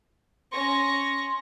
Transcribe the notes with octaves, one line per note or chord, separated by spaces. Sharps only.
C#4 C6 C#6 A#6